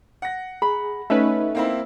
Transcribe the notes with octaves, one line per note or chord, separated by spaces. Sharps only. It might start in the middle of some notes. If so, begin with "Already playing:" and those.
F#5 A#6
G#4 B5
A3 C#4 D#4 B4 D#5 E5
A#3 C4 E4